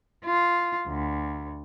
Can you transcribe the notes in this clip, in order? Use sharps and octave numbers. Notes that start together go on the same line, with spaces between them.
F4
D2